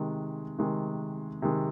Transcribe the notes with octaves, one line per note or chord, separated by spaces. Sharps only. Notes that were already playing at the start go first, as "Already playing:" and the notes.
Already playing: C3 D#3 G#3
C3 D#3 G#3
C3 D#3 G#3